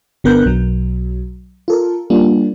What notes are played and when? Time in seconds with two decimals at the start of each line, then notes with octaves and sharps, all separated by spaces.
0.24 G1 D3 B3 A#4 F#6 G6
0.45 B1 F#3
1.68 F4 A4 A#4
2.10 G3 A#3 D4 F4